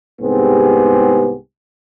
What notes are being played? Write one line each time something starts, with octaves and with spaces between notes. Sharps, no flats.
C2 G#2 B3 C4 G4 G#4